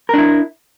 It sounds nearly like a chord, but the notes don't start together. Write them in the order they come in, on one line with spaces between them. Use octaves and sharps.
A#4 D4 E4